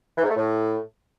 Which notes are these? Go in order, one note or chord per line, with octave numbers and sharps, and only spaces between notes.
E3
G#2
A3
A2